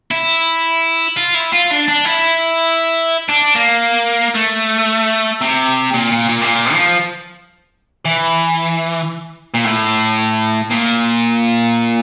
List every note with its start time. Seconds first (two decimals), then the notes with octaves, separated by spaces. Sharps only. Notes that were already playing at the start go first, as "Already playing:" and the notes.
0.11 E4
1.17 F4
1.34 E4
1.52 F4
1.70 D4
1.88 D4
2.05 E4
3.29 D4
3.55 A#3
4.35 A3
5.41 C3
5.94 A#2
6.11 A#2
6.29 A#2
6.42 C3
6.47 A#2
6.73 F3
8.05 E3
9.54 A#2
9.65 A2
10.70 A#2